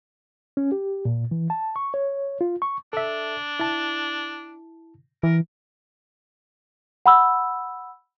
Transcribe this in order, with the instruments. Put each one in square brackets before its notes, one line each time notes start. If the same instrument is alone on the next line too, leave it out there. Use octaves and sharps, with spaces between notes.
[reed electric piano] C#4
G4
A#2
E3
A5
C#6
C#5
F4
C#6
[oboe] D4 [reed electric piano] A4 E5
[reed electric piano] E4 A5
[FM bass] E3 [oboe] A#4
[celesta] F#5 B5 E6